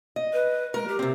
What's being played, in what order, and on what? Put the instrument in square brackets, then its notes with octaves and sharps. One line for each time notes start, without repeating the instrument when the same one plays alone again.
[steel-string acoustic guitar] D#5
[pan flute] B4
[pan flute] G#3 [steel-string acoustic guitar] A#4
[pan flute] G4
[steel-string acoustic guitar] C3 C4